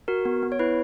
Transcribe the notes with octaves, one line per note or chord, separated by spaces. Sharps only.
F#4 A#4
B3
B3
C#5
E4 B4